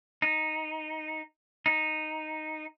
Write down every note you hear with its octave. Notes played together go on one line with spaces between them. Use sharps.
D#4
D#4